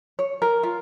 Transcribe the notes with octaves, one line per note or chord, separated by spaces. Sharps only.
C#5
A#4
F4